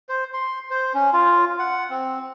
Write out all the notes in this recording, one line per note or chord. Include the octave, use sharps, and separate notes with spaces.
C5
C6
C5
C#4
F4
F#5
C4